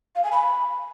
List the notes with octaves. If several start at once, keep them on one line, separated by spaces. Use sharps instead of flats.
F5
G#5
B5